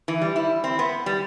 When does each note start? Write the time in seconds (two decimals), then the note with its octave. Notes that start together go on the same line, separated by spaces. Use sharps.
0.08 E3
0.21 G3
0.36 E4
0.64 C4
0.79 B3
1.06 G3